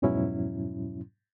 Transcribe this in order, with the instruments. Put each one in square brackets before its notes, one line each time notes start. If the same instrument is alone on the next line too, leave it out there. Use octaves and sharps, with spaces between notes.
[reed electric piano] F2 G#2 B2 F#3 C#4 E4